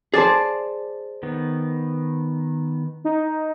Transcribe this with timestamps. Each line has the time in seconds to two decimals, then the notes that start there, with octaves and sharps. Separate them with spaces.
0.14 G#4 C5 D5 A5 A6
1.23 D#3 B3
3.04 D#4